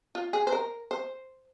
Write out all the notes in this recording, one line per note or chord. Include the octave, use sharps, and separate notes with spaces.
F4
G#4
C5
A#4
C5